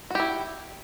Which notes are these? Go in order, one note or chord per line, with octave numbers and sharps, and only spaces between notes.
E4 F#4 G4